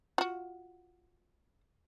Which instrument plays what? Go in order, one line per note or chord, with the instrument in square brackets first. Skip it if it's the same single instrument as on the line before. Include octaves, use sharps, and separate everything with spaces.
[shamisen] F4 F#4